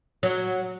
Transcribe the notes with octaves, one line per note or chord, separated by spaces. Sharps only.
F#3